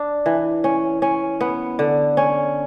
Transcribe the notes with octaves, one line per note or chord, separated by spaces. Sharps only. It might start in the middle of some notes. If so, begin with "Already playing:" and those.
Already playing: D4
E3
C#4
C#4
B3
D3
C#4